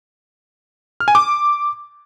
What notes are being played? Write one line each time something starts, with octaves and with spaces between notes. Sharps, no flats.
F6
G#5
D6